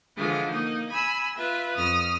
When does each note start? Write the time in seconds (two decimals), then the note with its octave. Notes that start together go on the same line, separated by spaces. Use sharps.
0.17 D3 E3 F3 G#3 F4
0.52 A#3 D#4
0.90 G#5 B5 E6
1.36 F4 B4 E5
1.74 F2 D#6 F6